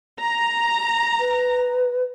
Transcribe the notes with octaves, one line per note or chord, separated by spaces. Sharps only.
A#5
B4